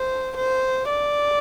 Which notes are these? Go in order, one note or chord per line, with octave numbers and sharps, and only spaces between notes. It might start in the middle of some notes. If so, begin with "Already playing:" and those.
Already playing: C5
C5
D5